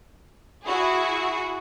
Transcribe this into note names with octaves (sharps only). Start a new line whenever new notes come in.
E4 F#4 G#4